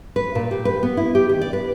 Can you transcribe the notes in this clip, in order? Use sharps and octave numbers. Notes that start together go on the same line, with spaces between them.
B4
A#2
G4
B4
B3
E4
G4
D#3
D5
B4